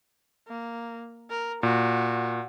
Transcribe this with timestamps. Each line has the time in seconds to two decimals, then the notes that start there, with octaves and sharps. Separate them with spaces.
0.48 A#3
1.30 A#4
1.63 A#2 F#4